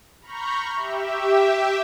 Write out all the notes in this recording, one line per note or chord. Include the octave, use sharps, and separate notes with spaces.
A#5 B5 C#6 F6 G6
G4 E5